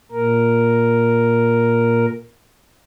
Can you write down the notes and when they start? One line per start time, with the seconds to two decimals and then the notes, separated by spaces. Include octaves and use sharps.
0.12 A#2 A#4